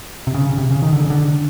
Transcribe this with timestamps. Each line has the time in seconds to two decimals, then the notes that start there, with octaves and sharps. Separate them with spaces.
0.27 C3
0.34 C#3
0.47 C#3
0.58 C3
0.71 C#3
0.82 D#3
0.93 D3
1.02 C#3
1.10 D3